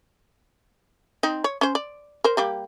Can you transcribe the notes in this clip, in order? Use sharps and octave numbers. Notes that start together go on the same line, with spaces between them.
C4 D#4
C#5
C#4 C5
D5
A#4 C5
G3 A#3 G4